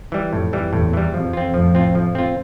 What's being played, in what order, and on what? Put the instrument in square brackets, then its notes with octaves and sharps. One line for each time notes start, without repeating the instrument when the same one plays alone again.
[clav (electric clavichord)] E3 G3
[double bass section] F2 [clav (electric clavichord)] A2
[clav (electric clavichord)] E3 G3
[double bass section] E2 [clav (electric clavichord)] A2
[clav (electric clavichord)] E3 G3
[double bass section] F2 [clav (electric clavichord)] F3
[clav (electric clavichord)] C4 F4
[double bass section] F2 A2 [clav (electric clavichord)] F3
[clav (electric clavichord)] C4 F4
F3
C4 F4